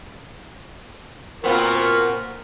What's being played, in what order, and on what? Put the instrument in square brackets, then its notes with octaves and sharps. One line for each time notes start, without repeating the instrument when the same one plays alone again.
[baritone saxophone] A#2 [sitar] B3 C4 F4 [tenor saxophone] F#4 [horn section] A#4